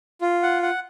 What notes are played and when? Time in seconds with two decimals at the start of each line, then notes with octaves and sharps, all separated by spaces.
0.21 F4
0.43 F#5
0.63 F#5